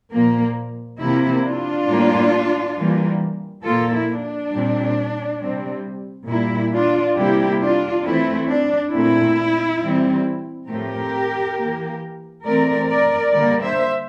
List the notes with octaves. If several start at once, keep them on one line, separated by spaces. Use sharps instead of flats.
A#2 F3 A#3
C3 F3 A#3 E4
D4 F4
A2 G3 A#3
E3 G3 A#3
A#2 F3 A#3 F4 A4
E4
D4
A#2 G3 C4
C3 G3 C4
A#2 G3 A#3 E4
D4 F4
C3 G3 A#3 E4 G4
D4 F4
E3 A3 C4 E4
D4
A#2 A3 C4 E4
E3 G3 C4
A2 F3 A3 C4 G4 A#4
E3 A#3
E3 A3 C4 A#4 D5
A#4 D5
D3 G3 A#3 A#4 D5
C5 E5